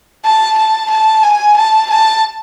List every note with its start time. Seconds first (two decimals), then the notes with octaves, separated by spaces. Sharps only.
0.25 A5
0.58 A5
0.90 A5
1.23 G#5
1.57 A5
1.90 A5